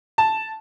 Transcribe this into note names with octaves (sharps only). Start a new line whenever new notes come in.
A5